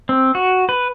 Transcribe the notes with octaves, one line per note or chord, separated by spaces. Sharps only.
C4
F#4
B4